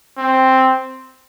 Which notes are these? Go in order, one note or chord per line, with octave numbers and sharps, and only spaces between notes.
C4